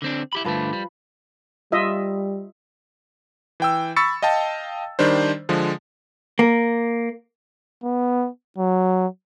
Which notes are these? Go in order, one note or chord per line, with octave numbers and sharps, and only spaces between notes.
D3 C4 D4
E4 G4 B5
G2 D3 F3 A3 B4
G3
G3 F4 D#5 E5
E3 G5 E6
B5 C#6 E6 A6 C#7
D#5 F5 G5 A5
D#3 G3 D4 C5
D3 F3 G#3
A#3
B3
F#3